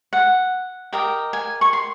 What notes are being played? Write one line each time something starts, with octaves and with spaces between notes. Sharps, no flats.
F#5
G4 A#4 D#5 G5
G#5
C#6
C6